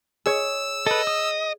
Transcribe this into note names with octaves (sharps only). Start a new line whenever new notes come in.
G#4 C#5 E6
A4 B4 D#5
D#6